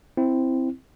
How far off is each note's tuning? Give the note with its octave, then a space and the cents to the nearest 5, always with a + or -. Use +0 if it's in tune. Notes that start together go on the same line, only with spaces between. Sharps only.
C4 +0 E4 +0